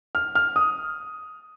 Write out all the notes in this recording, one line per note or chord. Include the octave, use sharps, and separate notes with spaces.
F6
F6
D#6